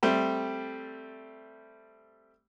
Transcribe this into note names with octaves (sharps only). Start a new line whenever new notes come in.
G3 A3 C4